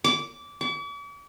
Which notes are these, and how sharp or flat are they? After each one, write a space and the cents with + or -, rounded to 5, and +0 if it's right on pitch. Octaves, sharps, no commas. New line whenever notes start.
D6 -20
D6 -45